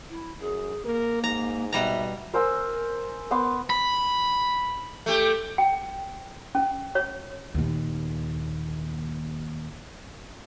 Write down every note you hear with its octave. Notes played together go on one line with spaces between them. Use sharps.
E4
F#2 G#4
A#3 A#4
G#2 A#5
B2 G3 E5 A#5
A#4 C5 G#5 E6
B3 C6 D6
B5
A3 G4
G5
C#4
C#5
D#2 A#2